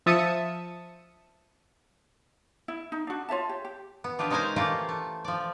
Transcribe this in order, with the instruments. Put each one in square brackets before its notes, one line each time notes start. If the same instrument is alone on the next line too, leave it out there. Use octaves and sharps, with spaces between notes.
[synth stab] F3 E5 A5 D#6 C#7 D#7
[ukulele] E4
D#4
D4 F#4
F4 C#5 E5 A5
G4
G4
[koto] B3
D4 F4 G4 G#4 B4
G#3 C#4 D#4 A#4 C5 G#5
E3 A3 A#3 F4 G4
A3
F3 D5